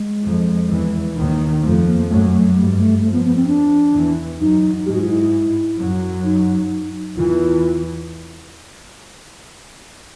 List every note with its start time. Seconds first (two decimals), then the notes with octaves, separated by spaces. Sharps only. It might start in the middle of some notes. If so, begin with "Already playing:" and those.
Already playing: G#3
0.23 F2 F3
0.69 E2 E3
1.16 D#2 D#3
1.62 F2 F3 A3
1.86 A#3
2.08 F#2 F#3 A3
2.31 A3
2.55 G2 G3 A3
2.69 G#3
2.78 A3
3.00 F2 F3 A3
3.13 B3
3.24 B3
3.36 C4
3.47 D4
3.93 E2 E3
4.39 F#2 F#3 D#4
4.85 G#2 G#3 G4
4.94 F#4
5.01 F4
5.09 E4
5.78 F#2 F#3
6.24 D#4
7.17 E2 E3 F4